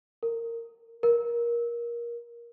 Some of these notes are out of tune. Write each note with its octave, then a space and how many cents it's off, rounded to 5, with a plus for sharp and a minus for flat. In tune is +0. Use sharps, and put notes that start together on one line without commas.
A#4 -15
A#4 +20